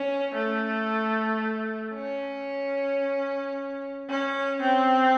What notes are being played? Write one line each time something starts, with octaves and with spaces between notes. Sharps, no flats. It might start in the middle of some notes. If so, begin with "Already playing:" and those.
Already playing: C#4
A3
C#4
C#4
C4